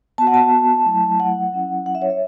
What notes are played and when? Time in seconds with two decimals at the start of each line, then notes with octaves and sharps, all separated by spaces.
0.18 B3 F#4 A5
0.27 F#5
0.34 A5
0.85 F#3 A3 E4
1.20 F#5
1.52 F#3 C#4 E4
1.86 F#5
1.95 E5
2.02 C#5
2.10 E5